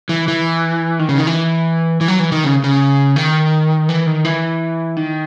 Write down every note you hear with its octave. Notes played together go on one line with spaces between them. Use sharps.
E3
E3
D#3
C#3
D#3
E3
E3
F#3
E3
D#3
C#3
C#3
D#3
E3
D#3
E3
D#3